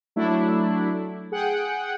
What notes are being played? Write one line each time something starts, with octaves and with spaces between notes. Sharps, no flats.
F#3 A3 D4 E4
G#4 F#5 G5